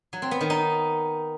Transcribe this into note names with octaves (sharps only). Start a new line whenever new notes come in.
F#3
C4
B3
D#3
D#4